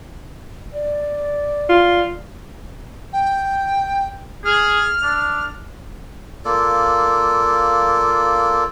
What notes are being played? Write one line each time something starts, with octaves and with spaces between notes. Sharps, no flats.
D5
F4
G5
G#4 F6
D4
A#3 F4 A4 D5